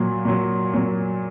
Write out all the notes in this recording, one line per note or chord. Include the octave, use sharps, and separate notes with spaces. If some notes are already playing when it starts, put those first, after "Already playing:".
Already playing: A#2 F#3
A#2 F#3
A#2 F#3